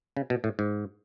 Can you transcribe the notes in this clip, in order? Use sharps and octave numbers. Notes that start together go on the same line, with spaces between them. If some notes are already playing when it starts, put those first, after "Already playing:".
C#3
B2
A2
G#2